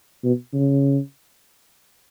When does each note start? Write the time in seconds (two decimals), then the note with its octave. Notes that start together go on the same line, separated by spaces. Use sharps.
0.24 B2
0.53 C#3